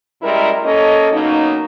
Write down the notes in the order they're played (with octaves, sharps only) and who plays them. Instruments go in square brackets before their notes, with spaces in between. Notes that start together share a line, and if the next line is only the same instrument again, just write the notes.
[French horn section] F#2 G3 G#3 E4 A#4
A#3 C#4 A4 D#5
B2 F#3 A#3 C#4 D#4